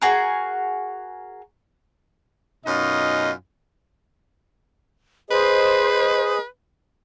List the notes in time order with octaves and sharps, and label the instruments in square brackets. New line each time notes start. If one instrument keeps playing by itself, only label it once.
[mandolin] F#4 G#4 A#4
[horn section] F#2 B2 C#4 D#4 F4 D#5
[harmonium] G#4 D#5 [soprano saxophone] B4 [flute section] C5